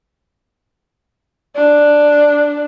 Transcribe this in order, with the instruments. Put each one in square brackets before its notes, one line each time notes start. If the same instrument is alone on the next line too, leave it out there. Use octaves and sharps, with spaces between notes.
[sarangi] D4